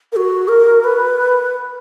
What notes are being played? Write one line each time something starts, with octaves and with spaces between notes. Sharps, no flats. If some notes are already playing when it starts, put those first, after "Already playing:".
A#4
F#4
A#4
B4